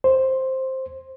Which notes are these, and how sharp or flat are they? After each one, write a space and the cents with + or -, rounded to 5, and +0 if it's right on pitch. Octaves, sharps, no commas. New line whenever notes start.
C5 +5